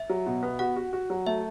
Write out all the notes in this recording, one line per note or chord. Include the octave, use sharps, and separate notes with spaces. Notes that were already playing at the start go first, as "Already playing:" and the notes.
Already playing: E5
F#3
B2
B3
F#4 F#5
F#4
F#4
F#3
A3 E5